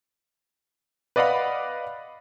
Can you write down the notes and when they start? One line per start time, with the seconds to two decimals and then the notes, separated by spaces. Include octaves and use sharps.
1.16 B4 D5 D#5 F5 F#5 B5